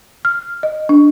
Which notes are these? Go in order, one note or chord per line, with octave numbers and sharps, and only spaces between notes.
F6
D#5
D4